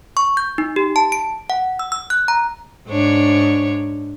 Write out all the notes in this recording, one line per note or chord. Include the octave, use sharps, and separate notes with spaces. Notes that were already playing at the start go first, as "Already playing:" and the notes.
C#6
G6
D#4
G4
A5
D7
F#5
E6
E6
F#6
A#5
G#2 D4 C#5